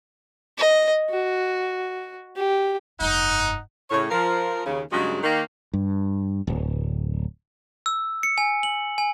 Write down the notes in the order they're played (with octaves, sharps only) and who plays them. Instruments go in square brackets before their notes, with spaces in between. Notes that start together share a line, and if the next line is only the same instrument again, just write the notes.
[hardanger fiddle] D#5
F#4
G4
[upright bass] F1 G2 [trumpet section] D#4 [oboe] F#5
[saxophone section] A2 C#3 C#5
F3 A#4
D#2 C#3
G2 C#3 F#3 G#3 D#4 F#4
D#3 A#3 D#4
[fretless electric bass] G2
D1
[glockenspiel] E6
C#7
G#5
F#7
G#5